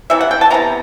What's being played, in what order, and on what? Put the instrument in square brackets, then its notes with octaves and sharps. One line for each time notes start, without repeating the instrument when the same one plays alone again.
[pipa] C3 E3 E5
F#5
G5
A5
C3 E3 B3 A#5